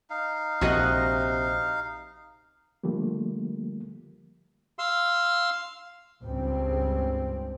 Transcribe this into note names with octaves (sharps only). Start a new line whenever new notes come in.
D#4 F5
A#1 C3 F#4 D#5 F#5
D3 F3 G3 A3 A#3
F5 C6 E6
C#2 G2 C4